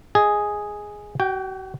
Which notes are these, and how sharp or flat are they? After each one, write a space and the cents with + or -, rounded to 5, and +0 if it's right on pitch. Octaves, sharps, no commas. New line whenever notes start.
G#4 +0 D#5 +0 G#5 +0
F#4 +40 G5 +0